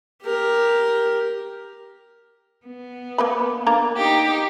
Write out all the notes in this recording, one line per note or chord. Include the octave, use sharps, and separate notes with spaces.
G4 A#4
B3
A#3 B4 B5
A#3 D4 A#5
D#4 G4